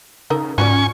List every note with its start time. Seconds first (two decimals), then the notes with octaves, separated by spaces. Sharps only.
0.30 C#3 D#4 A4 A#4
0.58 G#2 C#4 F4 F#4 D5 G#5 C#6